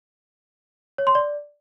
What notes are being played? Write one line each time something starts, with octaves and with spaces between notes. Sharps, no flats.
C#5
C6
D5